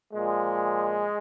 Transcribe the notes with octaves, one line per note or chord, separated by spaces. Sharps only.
A#2 F3 G#3